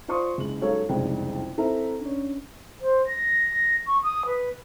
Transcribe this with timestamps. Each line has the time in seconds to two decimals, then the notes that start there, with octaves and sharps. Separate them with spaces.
0.08 F4 C5 D5 C6 C#6 D#6
0.38 F#1 G#3 F#7
0.62 F#3 G#3 D#4 A4 C#5 F5
0.89 F#1 C2 F2 D#3 G#3 G5
1.58 C4 E4 A4 A#4 E5 A#5
2.01 C#4 D4
2.81 C5
3.07 A#6
3.86 C#6
4.03 D#6
4.26 B4